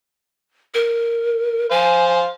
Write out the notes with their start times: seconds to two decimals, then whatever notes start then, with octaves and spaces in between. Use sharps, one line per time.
0.74 A#4
1.71 C5 F5 G#5